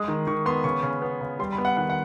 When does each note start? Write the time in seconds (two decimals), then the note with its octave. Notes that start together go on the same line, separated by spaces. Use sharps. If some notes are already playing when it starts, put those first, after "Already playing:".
Already playing: G#3 D#6
0.08 D#3
0.27 D#3 C#6
0.46 B3 C6
0.64 C#3 C#6
0.83 C#3
1.02 B3
1.21 C#3
1.39 G3 C6
1.52 B5
1.58 B3
1.65 F#5
1.77 D#3 F#5
1.90 F#5